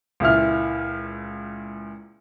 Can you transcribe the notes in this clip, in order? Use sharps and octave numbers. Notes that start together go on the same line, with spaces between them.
C#2 A#2 E4 F6